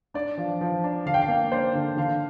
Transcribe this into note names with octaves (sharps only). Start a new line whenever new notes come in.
D4 D5
F3
F3
D4
D3 F5
G5
F5
A#3
D4 C5
D3
D3 F5